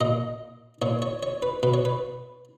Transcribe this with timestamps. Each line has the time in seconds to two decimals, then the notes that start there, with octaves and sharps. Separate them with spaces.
0.01 A#2 D#5
0.82 A#2 C#5
1.02 C#5
1.23 C#5
1.42 B4
1.63 B2 B4
1.74 C#5
1.85 B4